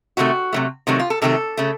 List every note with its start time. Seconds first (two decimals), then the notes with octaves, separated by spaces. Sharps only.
0.17 C3 D#3 F#3 A3 F#4
0.53 C3 D#3 F#3 A3
0.87 C3 D#3 F#3 A3 F#4
1.00 F4
1.10 A4
1.22 C3 D#3 F#3 A3 A4
1.57 C#3 A3